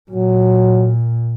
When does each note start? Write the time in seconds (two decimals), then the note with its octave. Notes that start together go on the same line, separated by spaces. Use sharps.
0.11 A#2 F#3